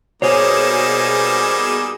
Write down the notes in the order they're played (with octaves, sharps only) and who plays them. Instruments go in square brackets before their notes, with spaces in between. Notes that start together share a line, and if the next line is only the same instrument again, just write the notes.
[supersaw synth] B2 G#4 E7 [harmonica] G3 A#3 D#4 [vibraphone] C5 [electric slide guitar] C#5